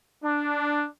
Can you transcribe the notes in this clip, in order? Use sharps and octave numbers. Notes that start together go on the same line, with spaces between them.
D4